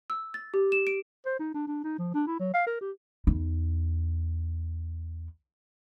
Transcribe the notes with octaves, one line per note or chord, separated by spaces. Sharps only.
E6
A6
G4
E7
D7
C5
D#4
D4
D4
D#4
F3
D4
E4
F#3
F5
A#4
G4
E2 D#4